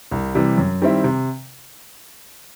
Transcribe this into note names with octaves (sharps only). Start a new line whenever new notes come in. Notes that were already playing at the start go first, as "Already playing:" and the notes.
C2
C3 E3 G3
F#2
D#3 G3 C4 E4
C3